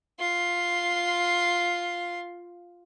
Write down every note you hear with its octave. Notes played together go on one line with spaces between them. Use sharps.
F4 C6